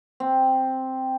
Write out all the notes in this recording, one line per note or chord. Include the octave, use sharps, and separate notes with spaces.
C4